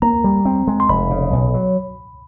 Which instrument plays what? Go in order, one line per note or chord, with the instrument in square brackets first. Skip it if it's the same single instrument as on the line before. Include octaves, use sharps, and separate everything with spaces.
[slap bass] A#3 [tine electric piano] A#5
[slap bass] G3
C4
G#3
[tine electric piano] C6
[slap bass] F1 [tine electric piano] B5
[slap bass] C#3
B1
F#3